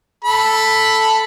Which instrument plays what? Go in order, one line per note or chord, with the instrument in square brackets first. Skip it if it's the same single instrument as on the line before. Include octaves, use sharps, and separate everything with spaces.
[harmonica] A4 B5